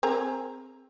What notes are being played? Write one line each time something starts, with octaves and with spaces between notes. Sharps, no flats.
C4 G#4 A#4